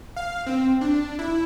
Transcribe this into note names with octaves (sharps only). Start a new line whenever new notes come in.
F5
C4
D4
E4